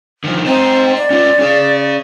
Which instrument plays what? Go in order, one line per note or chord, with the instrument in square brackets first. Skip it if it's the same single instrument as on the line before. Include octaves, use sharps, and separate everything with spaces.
[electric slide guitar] D3 D#3 F3
[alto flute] C4 [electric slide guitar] C5 D#5 A#5
[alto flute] D5
[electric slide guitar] C#4 F4 C#5
C#4 G#4